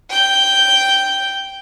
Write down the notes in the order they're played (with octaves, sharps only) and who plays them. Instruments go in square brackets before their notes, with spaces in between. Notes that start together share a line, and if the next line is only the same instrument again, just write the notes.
[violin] G5 G6